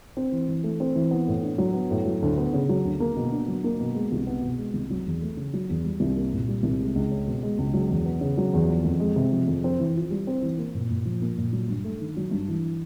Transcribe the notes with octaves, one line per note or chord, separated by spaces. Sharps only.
C4
E3
E3
A3
C4
E3
B3
A2
D4
F#3
B3
A2
F#3
D2
B3
C#3
F#3
D2
A#3
B2
D4
F#3
A#3
B2
G#3
C2
B3
B2
G#3
C2
F#3
E2
A3
C#3
F#3
E2
G3
C2
A#3
A#2
G3
C2
G#3
C#2
C#4
B2
G#3
C#2
F#3
E2
B3
C#3
F#3
E2
F3
F2
G#3
C3
F3
F2
C4
E3
F4
G3
C4
E3
A#3
A#2
A#2
F3
A#3
A#2
F#3
G2
A3
D#3
F#3
G2
E3